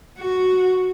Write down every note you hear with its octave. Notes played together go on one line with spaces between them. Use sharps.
F#4